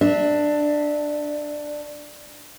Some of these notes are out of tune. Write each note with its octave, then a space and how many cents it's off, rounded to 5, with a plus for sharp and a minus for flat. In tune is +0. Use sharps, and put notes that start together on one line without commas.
D4 +10 E5 -20